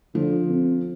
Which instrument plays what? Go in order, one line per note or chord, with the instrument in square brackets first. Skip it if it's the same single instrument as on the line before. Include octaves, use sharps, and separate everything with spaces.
[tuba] D3 [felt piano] F3
[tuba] C4